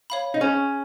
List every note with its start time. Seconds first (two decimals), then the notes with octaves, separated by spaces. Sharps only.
0.10 C#5 F5 B5
0.34 D#4
0.41 C#4 G#4